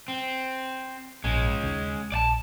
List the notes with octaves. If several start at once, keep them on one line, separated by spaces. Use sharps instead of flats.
C4
A#1 G#2 G#3 C#4
D#2 C#3
A#1 D5 A5